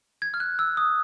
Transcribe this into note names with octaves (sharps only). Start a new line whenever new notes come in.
G#6
F6
F#6
E6
D#6